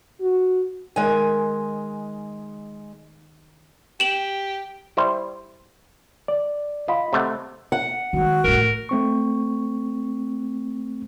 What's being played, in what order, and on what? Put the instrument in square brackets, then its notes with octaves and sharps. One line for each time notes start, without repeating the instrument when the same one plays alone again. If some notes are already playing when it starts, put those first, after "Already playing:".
[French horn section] F#4
[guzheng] D#3 [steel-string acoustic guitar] G#3 G#5
[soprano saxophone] G4 [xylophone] E7 F#7
[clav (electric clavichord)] G3 E4 C5
[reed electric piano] D5
[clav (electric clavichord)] F4 [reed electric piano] D#5 B5
[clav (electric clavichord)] C3 A3 F#5
[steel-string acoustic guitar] F#5
[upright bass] D#3 G#3 [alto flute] F#4
[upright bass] A2 A3 [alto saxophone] A#4
[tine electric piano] A3 C4 C#6